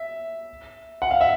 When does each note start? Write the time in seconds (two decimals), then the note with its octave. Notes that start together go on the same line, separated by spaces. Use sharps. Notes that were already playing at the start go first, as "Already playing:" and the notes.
Already playing: E5
1.02 F#5
1.11 F5
1.21 E5